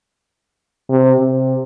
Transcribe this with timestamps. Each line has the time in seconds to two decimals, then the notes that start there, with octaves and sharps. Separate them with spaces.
0.89 C3
1.19 C3